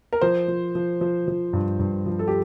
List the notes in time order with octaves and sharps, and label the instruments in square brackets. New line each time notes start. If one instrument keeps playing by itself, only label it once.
[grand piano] A#4
F3 C5
F3
F3
F3
F3
G2
G2
F3
A4
G4